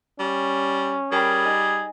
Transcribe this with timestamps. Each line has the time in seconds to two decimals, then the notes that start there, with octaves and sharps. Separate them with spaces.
0.20 G3 C#4
1.12 G3 G#4 A#4 G5 B5
1.45 D#4 D#5 G#5